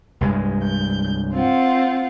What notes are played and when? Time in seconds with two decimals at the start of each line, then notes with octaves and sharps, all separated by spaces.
0.21 C2 G2 G#3
0.63 G6
1.33 C4 F4 F#5